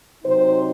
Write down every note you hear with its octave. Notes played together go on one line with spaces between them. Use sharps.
C3 F#3 C4 D#4 C5